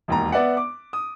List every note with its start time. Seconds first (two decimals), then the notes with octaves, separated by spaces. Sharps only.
0.08 E1 D#2 A#5
0.32 B3 D5 E5 F#5
0.57 D6
0.93 D#6